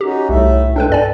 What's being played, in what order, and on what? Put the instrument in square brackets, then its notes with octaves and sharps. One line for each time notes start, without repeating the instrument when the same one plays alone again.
[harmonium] C#4 D#4 F#4 [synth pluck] G4
[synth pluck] C2 [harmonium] A2 A3 E5
[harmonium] B2 G#3 G5 [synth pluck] D4 A4 B4
[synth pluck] G2 D5 G#5 [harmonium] A4